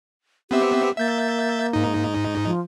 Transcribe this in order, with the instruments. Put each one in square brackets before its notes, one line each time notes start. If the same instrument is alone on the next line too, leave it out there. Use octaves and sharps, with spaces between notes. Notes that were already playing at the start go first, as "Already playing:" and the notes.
[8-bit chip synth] B3 C4 E5 [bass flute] G4
[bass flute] A#3 [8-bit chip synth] E5 G6 A6
[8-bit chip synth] G#2 D#4
[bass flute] F3